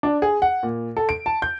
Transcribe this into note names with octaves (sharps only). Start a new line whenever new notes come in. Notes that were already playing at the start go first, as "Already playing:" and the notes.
D4
G#4
F#5
A#2
A4
D7
A5
G6